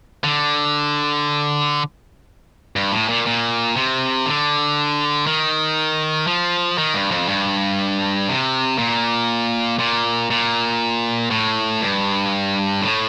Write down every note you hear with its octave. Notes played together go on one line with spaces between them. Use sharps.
D3
G2
A2
A#2
A#2
C3
D3
D#3
F3
D#3
G2
F2
G2
C3
A#2
A#2
A#2
A2
G2
A2